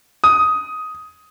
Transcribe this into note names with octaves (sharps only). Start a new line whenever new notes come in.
D#6